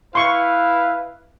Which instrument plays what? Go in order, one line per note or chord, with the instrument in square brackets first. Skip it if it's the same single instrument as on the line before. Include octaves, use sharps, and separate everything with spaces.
[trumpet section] E4 B4 F5 [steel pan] C6 C#6